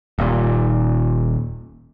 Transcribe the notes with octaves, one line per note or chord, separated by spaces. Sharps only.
D#1 A#2